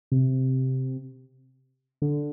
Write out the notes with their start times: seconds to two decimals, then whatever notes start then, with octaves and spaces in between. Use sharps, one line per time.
0.11 C3
2.02 D3